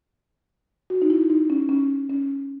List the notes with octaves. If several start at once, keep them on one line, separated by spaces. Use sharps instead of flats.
F#4
D#4
E4
D#4
C#4
C#4
C#4